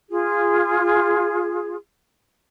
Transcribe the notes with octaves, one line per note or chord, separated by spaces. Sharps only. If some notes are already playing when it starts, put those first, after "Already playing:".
F4 G#4